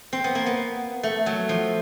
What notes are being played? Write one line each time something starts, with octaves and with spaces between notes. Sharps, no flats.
C4
B3
A#3
B3
A3
F#3
F3